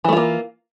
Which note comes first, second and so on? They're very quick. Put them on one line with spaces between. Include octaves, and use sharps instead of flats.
E3 A3 F4 A#3